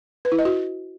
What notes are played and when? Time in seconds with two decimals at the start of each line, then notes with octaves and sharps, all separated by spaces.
0.25 B4
0.32 E4
0.39 D#5
0.45 F#4